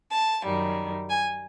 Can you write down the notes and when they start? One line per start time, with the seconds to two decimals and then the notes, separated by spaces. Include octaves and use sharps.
0.11 A5
0.43 F#2 D#3 G3
1.09 G#5